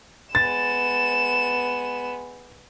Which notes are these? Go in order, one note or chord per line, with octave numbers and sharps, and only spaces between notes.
G#3 B3 A6 E7